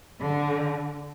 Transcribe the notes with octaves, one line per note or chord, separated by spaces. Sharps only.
D3